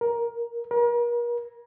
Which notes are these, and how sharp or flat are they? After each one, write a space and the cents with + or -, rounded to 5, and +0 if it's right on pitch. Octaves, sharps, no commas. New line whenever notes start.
A#4 +15
A#4 +40